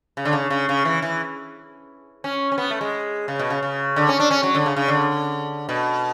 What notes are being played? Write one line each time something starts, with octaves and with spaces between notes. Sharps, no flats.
C#3
D3
C#3
C#3
C#3
E3
E3
C#4
C#4
B3
A3
G#3
C#3
B2
C#3
C#3
D3
C#4
D4
C#4
F#3
D3
C#3
C#3
D3
B2